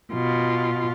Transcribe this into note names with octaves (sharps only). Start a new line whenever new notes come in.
B2 F4